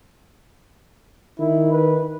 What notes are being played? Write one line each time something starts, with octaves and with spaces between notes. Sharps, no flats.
D#3 E4
B4